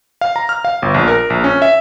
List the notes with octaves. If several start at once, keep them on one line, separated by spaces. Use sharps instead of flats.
F5
A#5
F6
F5
G1
A#1
A#4
A#1
C#4
E5